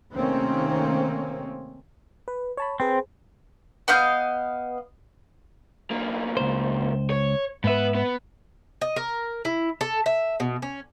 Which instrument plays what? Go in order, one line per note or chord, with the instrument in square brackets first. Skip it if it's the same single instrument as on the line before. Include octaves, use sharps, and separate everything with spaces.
[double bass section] C3 D#3 A3 A#3 C4 C#4
[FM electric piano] B4
C#5 A5 B5
[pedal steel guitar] C4 [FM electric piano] G#4 B4 C5
[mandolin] B3 D#5 F5 G6
[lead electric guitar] B1 A#3
[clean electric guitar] C#2 C5
[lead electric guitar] C#5
[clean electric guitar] G#2 E5 [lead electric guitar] B3 B4
[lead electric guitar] B3
[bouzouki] D#5
A#4
E4
A4
E5
B2
C#4